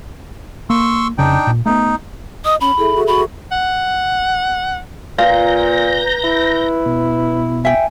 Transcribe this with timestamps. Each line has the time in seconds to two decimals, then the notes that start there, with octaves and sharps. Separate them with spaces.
0.70 A#3 C6 C#6 E6
1.18 F1 C#3 D4 D#4 G5
1.47 A#2
1.66 A3 B3 D#4
2.45 D#5 D#6
2.61 C#4 B5
2.78 E4 G#4 A4 E5
2.96 F#4
3.07 F#4 B5
3.52 F#5
5.18 A#2 F4 B4 A#5 G6 A#6
6.24 E4
6.86 B2
7.65 E5 G5 G#5